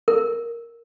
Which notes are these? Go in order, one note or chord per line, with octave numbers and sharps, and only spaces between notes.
A#4